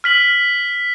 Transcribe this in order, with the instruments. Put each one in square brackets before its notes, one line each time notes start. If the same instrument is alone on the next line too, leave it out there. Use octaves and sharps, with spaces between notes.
[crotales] F6 B6 F#7